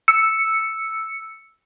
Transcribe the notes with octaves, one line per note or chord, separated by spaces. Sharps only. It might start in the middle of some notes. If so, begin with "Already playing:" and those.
E6 C#7